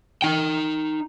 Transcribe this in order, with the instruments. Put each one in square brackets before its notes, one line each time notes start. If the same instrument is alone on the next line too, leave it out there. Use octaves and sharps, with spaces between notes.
[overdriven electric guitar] D#4 G5